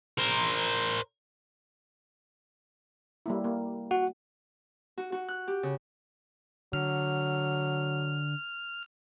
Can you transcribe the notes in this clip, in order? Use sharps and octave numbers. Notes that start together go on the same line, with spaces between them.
A#4 C5
G3 A#3 E4
A#3
F#4 F#5
F#4
F#4
F#6
G4
C#3
D3 F#3 F6